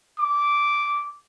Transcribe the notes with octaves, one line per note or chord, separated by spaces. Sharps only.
D6